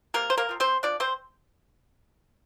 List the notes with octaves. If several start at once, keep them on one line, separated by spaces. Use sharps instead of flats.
C3 A#3 A#4
C5
A#3 A#4
F3 C4
C4 C5
F3 D4 D5
C4 C5